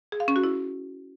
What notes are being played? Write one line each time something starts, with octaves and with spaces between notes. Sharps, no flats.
G#4
F5
C#4
F#4
E4